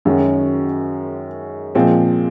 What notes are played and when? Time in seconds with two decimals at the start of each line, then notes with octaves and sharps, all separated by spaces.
0.05 F#2 D#3 G#3 C#4 F#4
1.75 A#2 F3 G#3 C4